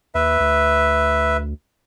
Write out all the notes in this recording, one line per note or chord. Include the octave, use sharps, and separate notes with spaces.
D#2 B4 E5
D2